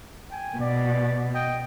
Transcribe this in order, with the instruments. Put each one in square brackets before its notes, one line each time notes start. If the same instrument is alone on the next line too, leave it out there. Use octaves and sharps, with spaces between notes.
[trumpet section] G5 G#5
[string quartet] B2 [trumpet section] D5
[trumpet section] D#5 G5